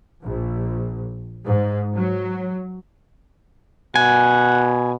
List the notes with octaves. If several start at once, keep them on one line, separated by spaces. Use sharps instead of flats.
A#1
G#2
F#3
B2 F#5 G#5